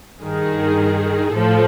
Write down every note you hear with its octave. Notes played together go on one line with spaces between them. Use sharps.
G2 D#3 G#4
A2 F3 A4